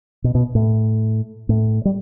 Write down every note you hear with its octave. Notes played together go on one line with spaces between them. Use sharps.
B2
B2
A2
A2
G3